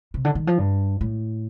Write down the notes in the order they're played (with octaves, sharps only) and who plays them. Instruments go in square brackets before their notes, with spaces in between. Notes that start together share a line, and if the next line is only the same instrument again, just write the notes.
[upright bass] C3
D3
D#3
F3
G2
A2